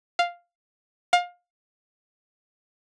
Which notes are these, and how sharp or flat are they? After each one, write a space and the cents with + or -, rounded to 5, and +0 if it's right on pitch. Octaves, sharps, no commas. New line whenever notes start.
F5 +0
F5 +25